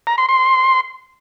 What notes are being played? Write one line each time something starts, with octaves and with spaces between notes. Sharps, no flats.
A#5
C6
C6